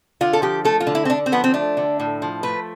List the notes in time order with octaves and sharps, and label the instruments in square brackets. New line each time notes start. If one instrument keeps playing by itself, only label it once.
[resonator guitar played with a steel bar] D3 F4
A4
F3 G4
A3 A4
F4
D3
E4
C4
D3 D4
C4
F3 B3
C4
A3 D4
D3
A2
F3
A3 B4